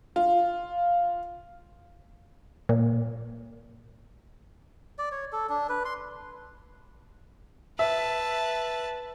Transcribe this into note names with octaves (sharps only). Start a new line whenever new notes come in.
F4
A#2
D5
C#5
A4
D4
B4
C6
B4 E5 A5